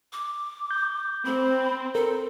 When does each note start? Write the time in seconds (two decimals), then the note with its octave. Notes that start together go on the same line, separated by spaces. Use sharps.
0.13 D6
0.71 G6
1.25 C4 B5
1.95 A4 A#4